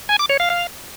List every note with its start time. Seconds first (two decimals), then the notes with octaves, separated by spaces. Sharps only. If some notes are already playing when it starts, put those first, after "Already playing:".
0.09 G#5
0.19 D6
0.30 C#5
0.40 F5
0.50 F5